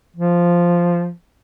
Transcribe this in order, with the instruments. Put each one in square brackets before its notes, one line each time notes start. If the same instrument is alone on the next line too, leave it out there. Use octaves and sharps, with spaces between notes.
[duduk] F3